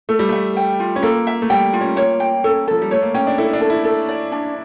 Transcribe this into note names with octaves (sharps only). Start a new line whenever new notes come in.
A3 A4
G3
A3 E5
G5
F4
C#4
A#3 A4
E5
A3
G3 G5
F4
C#4
A#3 C#5
G5
C#4 A4
F3 A4
G3
A3 C#5
A#3
C#4 G5
D4
E4 A4
D4
A4
E4
A4
D5
D4